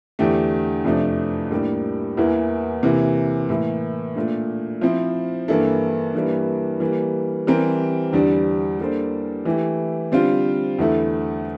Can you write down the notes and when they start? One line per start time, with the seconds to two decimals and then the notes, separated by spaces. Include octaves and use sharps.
0.19 E2 D3 A3 D4 G4
0.84 F2 C3 F3 A3 D4
1.51 A2 G3 A#3 D4 G4
2.17 E2 E3 A#3 E4
2.83 C3 E3 A#3 E4
3.49 A2 E3 A#3 E4
4.15 A#2 A3 D4
4.81 F3 C4 E4
5.48 G2 E3 A#3 E4 A4
6.14 G2 E3 G3 A#3 E4
6.80 E3 G3 A#3
7.47 E3 G3 C4 G4 A#4
8.13 E2 D3 G3 D4
8.79 G3 A#3 D4 A4 C5
9.45 E3 A3 E4 G4
10.12 D3 G3 C4 F4
10.79 E2 D3 A3 E4 A4